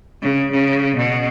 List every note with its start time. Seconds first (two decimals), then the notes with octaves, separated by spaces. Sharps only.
0.22 C#3
0.52 C#3
0.96 B2